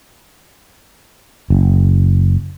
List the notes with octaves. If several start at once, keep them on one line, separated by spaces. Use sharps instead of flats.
F#1